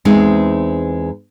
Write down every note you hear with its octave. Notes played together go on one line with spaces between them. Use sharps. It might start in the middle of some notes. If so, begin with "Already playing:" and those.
E2 G#3 C4 D#4